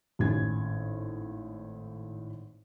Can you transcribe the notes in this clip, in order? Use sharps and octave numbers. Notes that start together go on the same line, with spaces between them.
G#1 A2 C#4 G#6